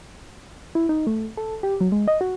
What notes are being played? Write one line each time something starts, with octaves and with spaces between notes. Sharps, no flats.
E4
D#4
A3
A4
G4
F#3
G#3
D#5
F#4